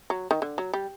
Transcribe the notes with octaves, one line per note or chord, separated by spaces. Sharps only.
F#3
D#3
D3
F#3
G3